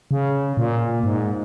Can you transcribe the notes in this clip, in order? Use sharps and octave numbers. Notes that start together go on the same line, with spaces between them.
C#3
A#2
G#2